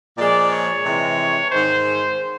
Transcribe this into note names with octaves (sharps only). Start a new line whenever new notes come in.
A#2 F3 G#3 D5
C#5
C3 E3 G#3
G#2 D#3 G#3 C5